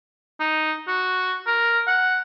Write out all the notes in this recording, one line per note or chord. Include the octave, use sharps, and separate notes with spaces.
D#4
F#4
A#4
F#5